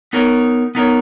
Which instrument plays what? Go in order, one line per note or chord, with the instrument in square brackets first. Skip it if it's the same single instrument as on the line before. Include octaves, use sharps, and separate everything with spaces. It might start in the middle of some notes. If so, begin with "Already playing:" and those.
[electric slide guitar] B3 D#4 A#4 C#5
B3 D#4 A#4 C#5